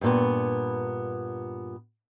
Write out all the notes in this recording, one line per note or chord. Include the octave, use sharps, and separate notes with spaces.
G2 A#2 B3